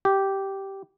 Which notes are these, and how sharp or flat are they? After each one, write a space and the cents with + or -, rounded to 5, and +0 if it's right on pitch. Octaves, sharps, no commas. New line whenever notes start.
G4 -10